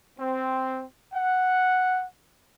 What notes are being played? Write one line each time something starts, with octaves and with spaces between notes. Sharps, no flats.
C4
F#5